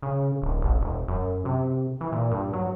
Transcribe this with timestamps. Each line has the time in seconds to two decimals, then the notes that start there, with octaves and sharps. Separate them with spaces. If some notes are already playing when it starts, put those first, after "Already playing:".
0.02 C#3
0.42 D1
0.62 A1
0.81 E1
1.08 F#2
1.45 C3
2.01 E3
2.12 A#2
2.32 G2
2.53 F#3